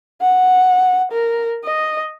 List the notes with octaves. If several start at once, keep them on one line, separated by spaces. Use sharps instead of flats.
F#5
A#4
D#5